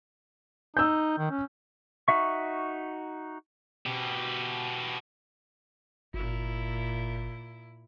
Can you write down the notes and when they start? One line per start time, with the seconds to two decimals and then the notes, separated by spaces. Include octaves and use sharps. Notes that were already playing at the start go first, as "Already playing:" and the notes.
0.77 D#4 E6 G6
1.18 D#3
1.30 C#4
2.08 D#4 F#4 E5 C#6
3.86 B2 G4
6.14 G1 A#2 E4